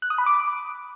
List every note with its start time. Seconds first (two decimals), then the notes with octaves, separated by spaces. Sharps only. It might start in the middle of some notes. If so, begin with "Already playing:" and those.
0.02 F#6
0.10 D#6
0.18 B5
0.26 D6